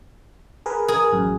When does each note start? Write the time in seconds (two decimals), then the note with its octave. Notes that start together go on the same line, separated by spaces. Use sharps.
0.66 G#4 A#4 B4
0.88 G#4 A#4
1.12 A1 F#2